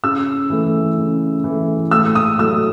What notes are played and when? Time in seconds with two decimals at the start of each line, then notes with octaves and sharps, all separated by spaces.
0.03 C#3 E6
0.50 E3 A3
0.97 C#3
1.44 E3 A3
1.91 A2 E6
2.15 D#6
2.39 F#3 A3 E6